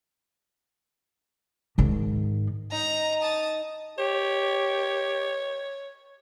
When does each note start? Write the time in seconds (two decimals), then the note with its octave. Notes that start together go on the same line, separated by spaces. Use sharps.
1.78 G#2 D#3
2.72 D#4 A#5
3.22 A5 D#6
3.99 G4 C#5